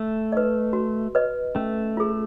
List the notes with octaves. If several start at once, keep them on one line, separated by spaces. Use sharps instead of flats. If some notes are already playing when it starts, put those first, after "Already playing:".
Already playing: A3
B4 D#5
F#4
B4 D#5
A3 C#4
F4 G#4